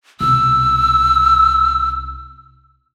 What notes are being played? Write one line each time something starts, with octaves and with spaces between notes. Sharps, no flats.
C2 B2 E6